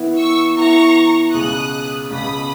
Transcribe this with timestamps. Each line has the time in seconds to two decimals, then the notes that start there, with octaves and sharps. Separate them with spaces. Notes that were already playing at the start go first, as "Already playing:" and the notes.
Already playing: E3 B3 E4
0.19 C#6 E6
0.57 E3 B3 E4 A#5 C#6
1.34 C#2 B2 G#3 D#6 F#6
2.10 C#2 B2 G#3 B5 D#6